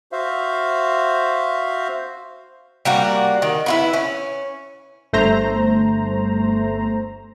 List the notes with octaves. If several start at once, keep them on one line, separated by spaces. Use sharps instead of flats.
F#4 C5 E5 F5
G3 A#3 F#4
D#3
E4 F4 B4
C#4
G1 A3 C5 A#5